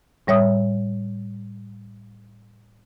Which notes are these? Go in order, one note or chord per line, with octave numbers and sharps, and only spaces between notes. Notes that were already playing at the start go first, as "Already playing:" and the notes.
A2 G3 C#5 E5 D#6